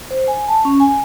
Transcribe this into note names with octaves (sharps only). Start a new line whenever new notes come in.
C5
G#5
A5
C#4
G#5